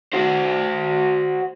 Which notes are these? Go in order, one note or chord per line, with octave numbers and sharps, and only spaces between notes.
F#4 C5